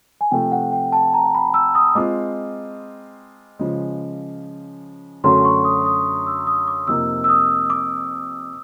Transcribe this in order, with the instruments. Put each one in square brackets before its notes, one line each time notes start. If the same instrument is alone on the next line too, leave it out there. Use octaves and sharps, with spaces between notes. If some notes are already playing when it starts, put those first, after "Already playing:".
[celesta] G#5
[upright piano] C3 F3 A3 [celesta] G5
[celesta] F#5
G5
A5
A#5
B5
E6
D#6
[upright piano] G#3 C4 F4 [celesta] D6
[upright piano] C#3 F3 G#3
[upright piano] F#2 D3 F#3 A3 C#4 [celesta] C6
[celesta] C#6
D#6
D#6
E6
D#6
D6
[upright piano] F2 C3 F3 A#3 D#4 [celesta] E6
[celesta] E6
D#6
D6